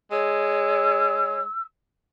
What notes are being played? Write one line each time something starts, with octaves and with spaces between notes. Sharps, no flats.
G#3 C#5 E6